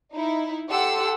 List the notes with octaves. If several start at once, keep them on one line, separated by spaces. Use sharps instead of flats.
D#4 E4
G4 A4 F#5 C6 E6